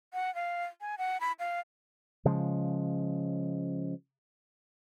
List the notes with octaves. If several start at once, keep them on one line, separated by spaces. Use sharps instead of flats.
F#5
F5
G#5
F#5
B5
F5
C#3 F3 G#3